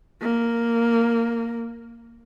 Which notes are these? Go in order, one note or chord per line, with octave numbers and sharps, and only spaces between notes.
A#3